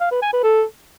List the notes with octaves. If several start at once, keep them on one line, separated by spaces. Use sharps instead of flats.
F5
B4
G#5
B4
A4